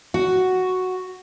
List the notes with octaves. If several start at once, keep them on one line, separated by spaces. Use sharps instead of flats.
F#4